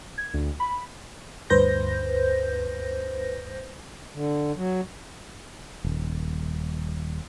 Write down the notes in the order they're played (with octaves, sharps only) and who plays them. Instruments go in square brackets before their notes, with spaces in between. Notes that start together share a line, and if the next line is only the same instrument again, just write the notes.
[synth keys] G#6
D2
B5
[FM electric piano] D2 G2 B4 C5 G6 A#6
[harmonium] D3
F#3
[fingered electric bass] D#1